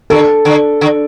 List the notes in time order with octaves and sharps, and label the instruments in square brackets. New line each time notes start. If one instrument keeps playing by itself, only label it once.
[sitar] D3 [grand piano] A4
[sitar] D3
D3